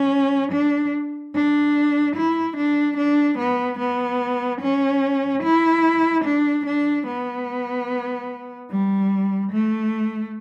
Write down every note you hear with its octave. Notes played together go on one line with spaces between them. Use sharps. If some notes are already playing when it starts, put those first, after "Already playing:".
Already playing: C#4
D4
D4
E4
D4
D4
B3
B3
C#4
E4
D4
D4
B3
G3
A3